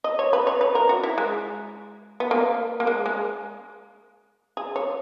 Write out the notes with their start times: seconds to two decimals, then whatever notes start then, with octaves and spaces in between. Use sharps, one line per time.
0.04 D#5
0.19 C#5
0.33 B4
0.47 C#5
0.61 B4
0.75 A#4
0.89 F#4
1.03 E4
1.18 G#3
2.20 B3
2.31 A#3
2.80 A#3
2.87 G#3
3.06 G#3
4.57 G#4
4.76 C#5